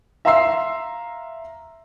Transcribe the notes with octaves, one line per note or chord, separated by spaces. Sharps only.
E5 F5 A#5 C6 E6 C7